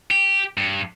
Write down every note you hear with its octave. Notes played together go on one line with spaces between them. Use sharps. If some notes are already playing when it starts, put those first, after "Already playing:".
G4
G2